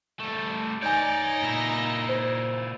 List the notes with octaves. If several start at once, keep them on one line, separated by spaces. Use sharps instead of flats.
G3 A3
D#4 C#5 D5 G#5 G6
A#2 E4
C5